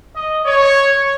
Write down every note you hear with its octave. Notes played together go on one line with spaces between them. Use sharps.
D#5
C#5